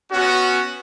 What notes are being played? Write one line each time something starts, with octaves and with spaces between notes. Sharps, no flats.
B3 C#4 F#4